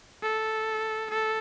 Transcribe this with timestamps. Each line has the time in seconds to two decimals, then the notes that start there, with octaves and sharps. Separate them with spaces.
0.23 A4
1.10 A4